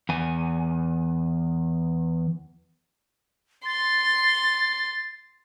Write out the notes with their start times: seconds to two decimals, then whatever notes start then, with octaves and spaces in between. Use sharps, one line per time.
0.09 E2 G#5
3.65 C6 A6